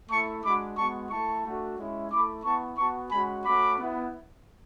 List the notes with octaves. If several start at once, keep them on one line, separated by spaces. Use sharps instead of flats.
A3 E4 A5 C#6
G#3 D4 F#4 B5 D6
G#3 B3 F#4 A5 C#6
A3 E4 A5 C#6
A3 D4 F#4
G#3 C#4 E4
A3 E4 B5 D6
B3 E4 A5 C#6
B3 F#4 A5 C#6
G#3 C#4 F#4 G#5 B5
A3 C#4 F#4 B5 D6
B3 E4